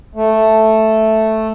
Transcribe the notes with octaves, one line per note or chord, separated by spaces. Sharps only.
A3